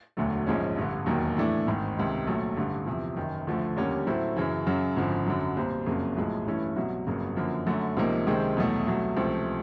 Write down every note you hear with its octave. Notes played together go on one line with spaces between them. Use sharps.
E1 D2 D3 F#3 A3
A#1 G#2 F3 G#3 C#4
A1 G2 D3
E1 D#2 D#3 F#3 A#3
A2 E3 A3 D4
G#1 G#2 D#3
C#2 C3 D#3
A#1 A#2 F#3 A3
A1 G2 D3
E2 C3 F3
F#1 F#2 D#3
D2 D3 F3 A3
D#2 D3 G3 A#3 C#4
A2 F#3 A3 C4 E4
F#2 C#3 E3
F#2 C#3 F#3
G#1 F#2 D3 F3
F#2 D3 F#3
B1 A#2 G3 C4
F#1 F2 C#3 F#3 A#3
B1 A2 F3 G#3
G2 E3 A3 C#4 E4
C2 B2 F#3
G1 F2 C#3 F#3 A#3
F#2 D3 F3 A#3
F#2 D3 F#3 A3
C#2 C3 F3 A#3 D#4
C#2 C3 D#3 G#3 C4
E2 B2 F#3 A3
C2 B2 F#3 A3
C#2 C3 F3 A3 C4